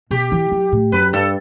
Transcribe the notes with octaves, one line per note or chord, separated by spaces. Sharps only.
B2 G4
E3
F#3
A2
F#2 B4
G2 A4